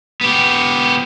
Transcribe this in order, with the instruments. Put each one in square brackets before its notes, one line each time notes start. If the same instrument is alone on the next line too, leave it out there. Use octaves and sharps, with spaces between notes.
[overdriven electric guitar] B3 G4